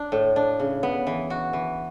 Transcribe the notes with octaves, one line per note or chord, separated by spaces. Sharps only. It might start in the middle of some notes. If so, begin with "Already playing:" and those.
Already playing: D4
A2
D4
C#3
B3
E3
F#4
E3